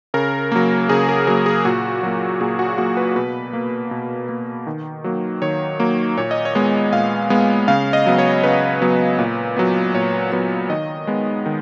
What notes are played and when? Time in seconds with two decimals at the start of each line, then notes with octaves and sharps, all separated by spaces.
0.14 C#3 A#4
0.52 F#3 A#3
0.89 C#3 G#4
1.09 A#4
1.27 F#3 A#3 A#4
1.46 G#4
1.65 A#2 F#4
2.03 F#3 A#3
2.40 A#2 G#4
2.59 F#4
2.78 F#3 A#3 F#4
2.97 B4
3.16 B2 B4
3.53 A#3
3.91 B2
4.29 A#3
4.67 D#3
5.04 F#3 A#3
5.42 D#3 C#5
5.80 F#3 A#3
6.18 A#2 C#5
6.31 D#5
6.45 C#5
6.55 G#3 B3
6.92 A#2 F5
7.30 G#3 B3
7.68 C#3 F5
7.93 D#5
8.06 F#3 B3
8.18 C#5
8.43 C#3 B4
8.81 F#3 B3
9.19 A#2
9.57 F#3 B3
9.94 A#2 C#5
10.32 F#3 B3
10.70 D#3 D#5
11.07 G#3 B3
11.46 D#3